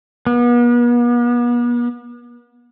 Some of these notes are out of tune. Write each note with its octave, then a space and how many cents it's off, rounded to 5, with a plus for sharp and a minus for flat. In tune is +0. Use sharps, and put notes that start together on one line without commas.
B3 -40